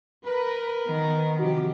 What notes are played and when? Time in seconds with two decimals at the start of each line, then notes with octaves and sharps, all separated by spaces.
0.25 A#4 B4
0.88 D#3 B3
1.39 C3 F3 F#4 G4